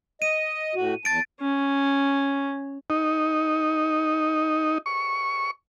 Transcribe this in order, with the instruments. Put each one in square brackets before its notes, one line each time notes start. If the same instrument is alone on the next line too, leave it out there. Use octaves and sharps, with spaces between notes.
[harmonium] D#5 [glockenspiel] D#7
[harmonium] A2 F#4
[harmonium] E2 A5 [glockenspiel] A6 D7
[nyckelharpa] C#4
[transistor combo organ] D#4
C#6